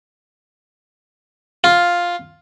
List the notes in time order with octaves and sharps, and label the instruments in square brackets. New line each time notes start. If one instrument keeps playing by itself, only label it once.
[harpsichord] F4